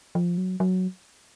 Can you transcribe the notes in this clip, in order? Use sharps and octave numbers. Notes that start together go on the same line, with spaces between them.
F3
F#3
F#3